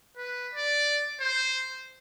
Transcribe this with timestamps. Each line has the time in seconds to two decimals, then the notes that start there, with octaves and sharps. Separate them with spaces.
0.18 B4
0.54 D5
1.21 C5